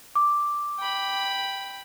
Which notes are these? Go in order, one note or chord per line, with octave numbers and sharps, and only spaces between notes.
D6
G5 B5